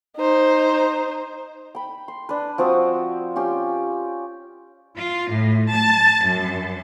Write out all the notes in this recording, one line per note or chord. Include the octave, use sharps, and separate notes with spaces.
D#4 C5
G5 B5
C6
D4 B4
F3 C4 F#4 D#6
C#4 F4 G4
F4
A2
A5
F#2